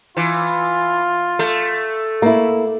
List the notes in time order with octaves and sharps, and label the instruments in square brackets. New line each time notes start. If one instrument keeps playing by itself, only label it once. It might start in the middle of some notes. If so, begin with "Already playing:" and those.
[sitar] E3 [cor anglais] F4
[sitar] A3
[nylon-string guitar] A#3 E4